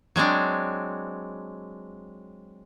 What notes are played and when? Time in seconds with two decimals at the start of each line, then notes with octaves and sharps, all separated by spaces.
0.16 F#3 G#3 C4 D4